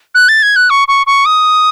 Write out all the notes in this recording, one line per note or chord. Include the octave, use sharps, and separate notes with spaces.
F#6
A6
G#6
F#6
C#6
C#6
C#6
D#6